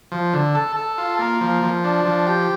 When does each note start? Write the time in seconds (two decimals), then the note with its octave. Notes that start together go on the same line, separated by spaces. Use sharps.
0.12 F3
0.33 D3
0.55 A4
0.76 A4
0.98 F4
1.19 A#3
1.41 F3
1.63 F3
1.84 D4
2.05 F3
2.27 G4